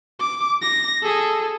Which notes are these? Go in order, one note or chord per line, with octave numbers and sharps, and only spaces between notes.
D6
A#6
G#4 A4